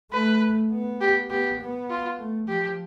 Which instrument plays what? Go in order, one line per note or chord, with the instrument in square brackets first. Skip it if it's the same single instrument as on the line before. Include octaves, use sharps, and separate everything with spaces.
[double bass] A3 [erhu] B4
[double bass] B3
[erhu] G4
[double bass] B3 [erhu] G4
[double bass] B3
[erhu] F4
[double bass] A3
[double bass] F3 [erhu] G4